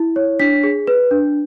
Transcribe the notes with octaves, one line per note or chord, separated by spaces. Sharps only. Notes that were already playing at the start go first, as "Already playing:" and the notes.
Already playing: E4
C#5
D4 B6
G#4
B4
D4